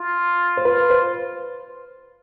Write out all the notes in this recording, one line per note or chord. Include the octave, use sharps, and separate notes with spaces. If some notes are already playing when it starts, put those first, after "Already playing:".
Already playing: F4
C5
F4 B4
C5